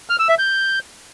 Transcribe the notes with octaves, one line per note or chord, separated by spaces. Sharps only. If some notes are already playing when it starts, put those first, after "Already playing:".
F6
E6
E5
G6